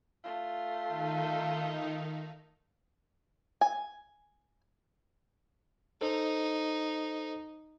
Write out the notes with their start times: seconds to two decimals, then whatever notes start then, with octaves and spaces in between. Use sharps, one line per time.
0.23 A3 F4
0.88 D#3 D#4
3.61 G#5
6.01 D#4 A4 C5